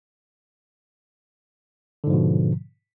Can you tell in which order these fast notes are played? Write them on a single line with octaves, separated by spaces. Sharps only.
D3 G#2 F3 B2